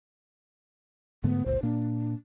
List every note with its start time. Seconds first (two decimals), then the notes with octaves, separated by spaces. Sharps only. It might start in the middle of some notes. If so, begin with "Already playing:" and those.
1.24 G#2 D3 A3 B3
1.46 G1 C#2 A#2 C5
1.63 A#2 A#3 D4